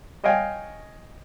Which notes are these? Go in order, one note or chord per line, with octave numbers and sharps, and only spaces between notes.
C#5 D#5 F5 G5 G#5